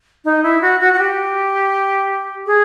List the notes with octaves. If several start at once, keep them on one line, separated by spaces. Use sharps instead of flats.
D#4
E4
F#4
F#4
F#4
G4
G#4